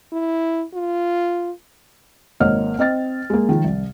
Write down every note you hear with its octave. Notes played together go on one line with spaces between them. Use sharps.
E4
F4
G#1 A#3 C#5 D#5 F#5 F6
C4 D#5 F6 A6
G#3 A#3
D#3 F3
C2